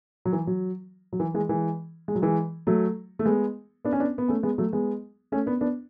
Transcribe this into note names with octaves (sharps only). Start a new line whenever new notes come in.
F#3
E3
F#3
F#3
E3
E3 G#3
E3 G#3
G#3
F#3
E3 G#3
F#3 A3
A3
G#3 B3
B3 D4
C#4
B3 D4
B3
A3 C#4
G#3 B3
F#3 A3
G#3 B3
A3 C#4
B3 D4
B3 D4